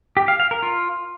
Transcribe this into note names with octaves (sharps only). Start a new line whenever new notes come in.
G4
F5
F5
A#4
F4